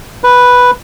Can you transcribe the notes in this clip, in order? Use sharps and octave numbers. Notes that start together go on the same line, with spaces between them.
B4